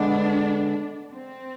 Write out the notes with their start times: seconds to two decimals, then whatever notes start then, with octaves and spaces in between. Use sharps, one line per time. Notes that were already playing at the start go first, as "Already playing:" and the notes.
Already playing: D3 G#3 B3 D4
1.13 C4